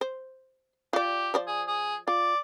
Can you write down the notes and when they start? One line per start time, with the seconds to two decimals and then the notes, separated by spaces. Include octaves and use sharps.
0.01 C5
0.93 F4 G4 D5
1.34 F3 C5 D5
1.47 G#4
1.68 G#4
2.08 F4 D5